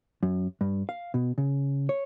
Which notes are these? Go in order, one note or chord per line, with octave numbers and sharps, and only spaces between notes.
F#2
G2
F5
B2
C#3
C#5